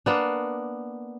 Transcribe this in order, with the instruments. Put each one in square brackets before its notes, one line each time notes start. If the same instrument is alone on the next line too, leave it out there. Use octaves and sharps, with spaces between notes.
[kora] A#3 B3 D4